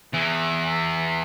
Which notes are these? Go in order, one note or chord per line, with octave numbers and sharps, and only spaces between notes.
E2 E3